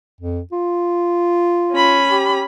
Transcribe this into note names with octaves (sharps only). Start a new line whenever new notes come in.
F2
F4
C#4 B5
G4